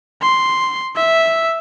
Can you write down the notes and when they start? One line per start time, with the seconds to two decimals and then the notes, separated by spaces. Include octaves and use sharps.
0.22 C6
0.95 E5